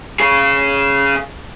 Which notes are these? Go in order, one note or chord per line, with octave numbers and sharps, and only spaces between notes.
C#3 G#4